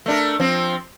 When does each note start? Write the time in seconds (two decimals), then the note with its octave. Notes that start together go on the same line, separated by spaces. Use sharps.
0.06 A3 D4 A#4
0.40 F3 C4